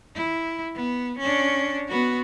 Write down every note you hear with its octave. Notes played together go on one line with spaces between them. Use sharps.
E4
B3
C#4 D4
B3 F#4